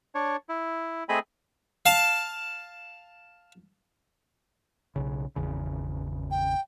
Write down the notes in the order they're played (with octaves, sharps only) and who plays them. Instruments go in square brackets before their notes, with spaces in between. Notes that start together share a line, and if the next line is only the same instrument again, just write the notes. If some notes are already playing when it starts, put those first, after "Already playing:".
[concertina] D4 C#5
E4
A3 C4 G#4 D#5 G#5 B5
[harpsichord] F5 A5
[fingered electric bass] B1 C#3
G#1 E2 C#3
[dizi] G5